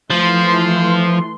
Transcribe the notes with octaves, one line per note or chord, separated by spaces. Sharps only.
E3 F3 A3 C6